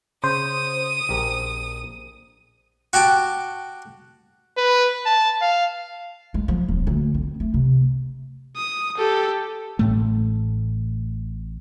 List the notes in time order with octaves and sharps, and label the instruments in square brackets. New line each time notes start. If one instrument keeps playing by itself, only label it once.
[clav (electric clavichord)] C#3 [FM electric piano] C5 [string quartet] D#6
[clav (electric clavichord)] A#1 G4 A#4
[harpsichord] F#4 G4 A5 D6
[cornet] B4
A5
F5
[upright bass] G#3
F3
D#1
D2
C4
A3
C3
[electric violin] D#6
G4 A4
[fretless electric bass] A1 A2 A3